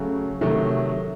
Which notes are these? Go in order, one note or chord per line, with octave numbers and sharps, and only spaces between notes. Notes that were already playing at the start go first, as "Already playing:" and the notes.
Already playing: C#3 F#3 A3
C3 D#3 F#3 A3